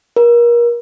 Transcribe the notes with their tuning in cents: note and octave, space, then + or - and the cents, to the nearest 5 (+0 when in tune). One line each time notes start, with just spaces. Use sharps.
A#4 +30